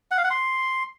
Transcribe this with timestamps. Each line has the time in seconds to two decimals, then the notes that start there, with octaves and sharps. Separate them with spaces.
0.11 F#5
0.18 F5
0.24 F#5
0.31 C6